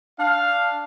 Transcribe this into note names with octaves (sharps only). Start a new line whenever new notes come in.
D4 F5